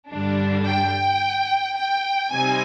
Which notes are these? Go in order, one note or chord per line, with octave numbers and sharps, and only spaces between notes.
G2 D3 G3 D4
G5
G5
C3 G3 C4 D#4 G#5